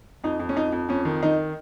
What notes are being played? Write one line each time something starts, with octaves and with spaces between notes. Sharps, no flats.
F2 D#4
F2
C#4
F2 D#4
F2
F2 C#4
D#3
D#3 D#4